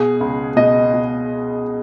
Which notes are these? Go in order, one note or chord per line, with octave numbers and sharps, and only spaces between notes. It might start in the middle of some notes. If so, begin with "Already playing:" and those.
Already playing: B2 G#4
C#2
B2 D#5
B2